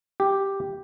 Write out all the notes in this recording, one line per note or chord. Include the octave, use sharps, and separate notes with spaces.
G4